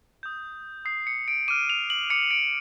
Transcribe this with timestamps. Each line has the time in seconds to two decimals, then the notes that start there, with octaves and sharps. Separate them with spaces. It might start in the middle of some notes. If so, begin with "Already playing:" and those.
0.23 D#6 G6
0.85 D#6 G6 C7
1.07 C#7
1.28 D7
1.48 D6 F6 D#7
1.70 F7
1.90 F#7
2.10 D6 F6 C#7
2.31 D7